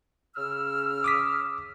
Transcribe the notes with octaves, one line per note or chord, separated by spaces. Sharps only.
C#3 E6 F6
D6 D#6 B6